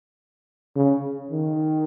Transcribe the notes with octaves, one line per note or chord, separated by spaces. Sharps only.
C#3
D#3